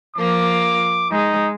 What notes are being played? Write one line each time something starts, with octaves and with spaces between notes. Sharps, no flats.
F3 A#3 F4 D6
G#3 D#4